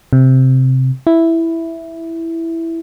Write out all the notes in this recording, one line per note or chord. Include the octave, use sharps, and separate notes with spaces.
C3
E4